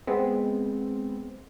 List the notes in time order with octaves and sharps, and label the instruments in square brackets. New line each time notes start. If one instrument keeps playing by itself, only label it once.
[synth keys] G#3 B3 C4